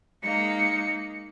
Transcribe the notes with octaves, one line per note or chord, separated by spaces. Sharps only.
G#3 A#3 D#4 C#7